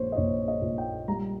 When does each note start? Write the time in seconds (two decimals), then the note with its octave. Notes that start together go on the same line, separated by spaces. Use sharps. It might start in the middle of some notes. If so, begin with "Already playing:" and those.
Already playing: A#1 C5 C#5
0.12 D#5
0.16 A#1 C#5
0.48 D#5
0.62 A#2
0.78 G5
1.08 G3 A#5